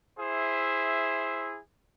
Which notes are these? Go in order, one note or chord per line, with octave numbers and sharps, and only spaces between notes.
E4 G#4 C5 E5